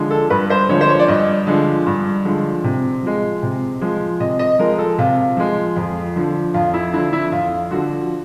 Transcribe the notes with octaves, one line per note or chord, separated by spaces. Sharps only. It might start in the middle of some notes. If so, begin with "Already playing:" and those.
Already playing: D3 F3 G#3
A4
G2 B4
C5
D3 F3 G#3 C#5
C5
C#5
D5
G2 D#5
D3 F3 G#3
G2
D3 F3 G#3
C3
F3 G#3
C3
F3 G#3
C3 D#5
D#5
F3 G#3 A#4
A4
C3 F4
F3 G#3
F2
D3 F3
F2 F4
E4
D3 F3 E4
E4
F2 F4
D3 F3 F#4